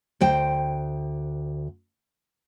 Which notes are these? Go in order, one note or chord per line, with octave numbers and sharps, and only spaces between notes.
D2 C5 G5